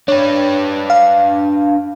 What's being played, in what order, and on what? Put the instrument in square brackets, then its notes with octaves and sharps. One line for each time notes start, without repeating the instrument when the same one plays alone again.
[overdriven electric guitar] D4 B4 [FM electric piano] C#5
[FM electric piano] F5